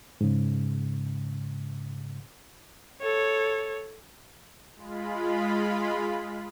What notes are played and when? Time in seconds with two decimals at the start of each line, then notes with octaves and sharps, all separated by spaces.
0.21 G#2 C#3
3.01 A4 C#5
4.76 G#3 F4 B5